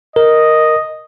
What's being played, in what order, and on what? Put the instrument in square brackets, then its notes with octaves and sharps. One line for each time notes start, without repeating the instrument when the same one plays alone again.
[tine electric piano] A#4 [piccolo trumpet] D#5